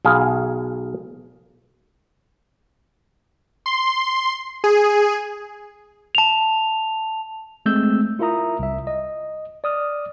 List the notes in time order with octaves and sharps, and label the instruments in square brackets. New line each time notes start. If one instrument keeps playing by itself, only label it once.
[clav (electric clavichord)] B1 G#4 F5
[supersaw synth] C6
G#4
[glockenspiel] A5 F7
[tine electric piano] G#3 A3 C4 E6 G6
E4 F4 A#4 E5 A#5 D#6
C2 E5
D#5
D5 D#6 F6